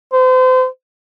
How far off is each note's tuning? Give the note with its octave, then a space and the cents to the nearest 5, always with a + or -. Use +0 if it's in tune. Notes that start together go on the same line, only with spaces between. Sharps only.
C5 -35